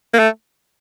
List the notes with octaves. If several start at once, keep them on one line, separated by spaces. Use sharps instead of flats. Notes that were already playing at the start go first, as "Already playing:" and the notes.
A#3
A3